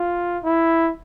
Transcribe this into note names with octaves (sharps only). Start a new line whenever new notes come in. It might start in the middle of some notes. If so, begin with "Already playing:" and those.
Already playing: F4
E4